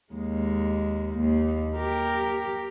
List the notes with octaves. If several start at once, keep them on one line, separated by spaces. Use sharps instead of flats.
D#2 G#3
D#2
G4 A#4